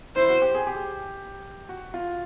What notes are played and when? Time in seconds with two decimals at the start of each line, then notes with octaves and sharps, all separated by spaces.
0.16 E4 C5
0.29 F#4
0.42 G4
0.55 G#4
0.67 G4
1.69 F#4
1.94 F4